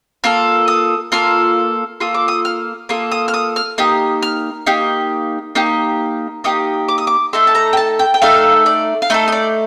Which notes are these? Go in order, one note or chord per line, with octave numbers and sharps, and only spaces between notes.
A#3 F4 A4 F6
D#6
A#3 F4 A4 F6
A#3 F4 A4 D#6
D6
D#6
F6
A#3 F4 A4 D#6
D#6
F6
D#6
F6
A#3 D#4 G4 D#6
F6
A#3 D#4 G4
A#3 D#4 G4
A#3 D#4 G4 D#6
D6
D#6
D6
A3 D#4 A4 C6
A5
A#5
G5
A5
G5
G5
A3 D#4 A4 F5
D5
F5
A3 D#4 A4 D#5
D#5
D5